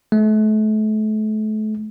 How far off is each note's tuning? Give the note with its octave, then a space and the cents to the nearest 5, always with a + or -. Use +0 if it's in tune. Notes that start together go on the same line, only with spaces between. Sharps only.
A3 -35